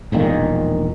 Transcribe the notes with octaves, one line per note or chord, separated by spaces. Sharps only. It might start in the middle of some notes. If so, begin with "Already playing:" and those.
E1 A#1 A#2 D#3